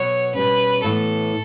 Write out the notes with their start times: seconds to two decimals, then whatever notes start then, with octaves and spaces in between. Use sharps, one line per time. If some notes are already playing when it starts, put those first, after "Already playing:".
Already playing: B2 F#3 B3 F#4 C#5
0.34 B2 G3 C#4 B4
0.84 A2 E3 B3 A4